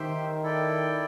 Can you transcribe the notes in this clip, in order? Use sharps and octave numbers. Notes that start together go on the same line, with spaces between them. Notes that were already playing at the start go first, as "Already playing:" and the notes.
Already playing: D#3 G4 C5 E5 G5
E4 A4 D5 G5